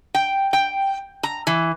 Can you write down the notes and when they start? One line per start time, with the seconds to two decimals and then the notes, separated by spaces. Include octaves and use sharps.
0.15 G5
0.53 G5
1.23 A#5
1.47 E3